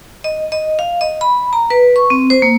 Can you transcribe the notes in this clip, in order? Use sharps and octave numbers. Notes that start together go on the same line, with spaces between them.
D#5
D#5
F5
D#5
B5
A#5
B4
C#6
C4
C5
A#3